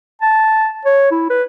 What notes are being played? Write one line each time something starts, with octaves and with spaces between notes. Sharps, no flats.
A5
C#5
E4
B4